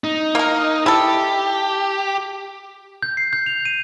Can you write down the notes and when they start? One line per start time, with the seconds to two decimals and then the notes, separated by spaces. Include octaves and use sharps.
0.04 D#4
0.35 A#3 A#4
0.86 E4 G4 A4
3.03 G6
3.17 C7
3.33 G6
3.46 F7
3.65 D#7